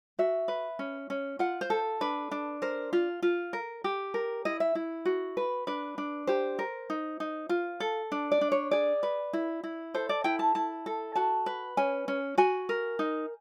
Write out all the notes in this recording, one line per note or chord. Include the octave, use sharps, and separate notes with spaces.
F#4 E5
B4
C#4
C#4
F4 F#5
C5
A4
D4 B4
D4
A#4 C5
F4
F4
A#4
G4
A#4
E4 D#5
E5
E4
F#4
B4
D4 B4
D4
G4 C5
A#4
D#4
D#4
F4
A4
D4
D5
D4
C#5
G#4 D5
B4
E4
E4
A4 C5
D5
E4 G5
A5
E4 A5
A4
F#4 A5
B4
C#4 G#5
C#4
F#4 G#5
A#4
D#4